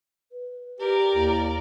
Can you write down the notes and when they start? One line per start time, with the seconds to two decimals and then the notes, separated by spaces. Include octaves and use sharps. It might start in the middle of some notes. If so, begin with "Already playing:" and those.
0.32 B4
0.79 G4 A#4 D5
1.15 D#2 E4